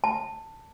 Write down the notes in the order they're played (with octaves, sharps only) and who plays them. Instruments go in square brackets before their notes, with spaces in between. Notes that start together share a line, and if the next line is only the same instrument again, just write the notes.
[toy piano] A5